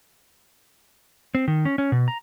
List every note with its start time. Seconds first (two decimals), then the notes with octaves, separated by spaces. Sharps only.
1.35 C4
1.48 D#3
1.65 C#4
1.78 C#4
1.92 B2
2.08 A#5